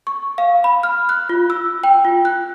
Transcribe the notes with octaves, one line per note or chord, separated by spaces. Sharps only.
C#6
F5
B5
F6
F#6
F4
E6
G5
F4
F#6